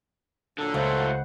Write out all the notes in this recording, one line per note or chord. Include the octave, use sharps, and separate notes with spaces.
A#2 D3 F#3 A4
C#2 A3 F4 C5 F#5